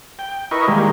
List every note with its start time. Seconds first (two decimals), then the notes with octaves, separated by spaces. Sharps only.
0.19 G5
0.51 E4 A#4 B4 D#5 C#6
0.68 D#3 G3 G#3 A#3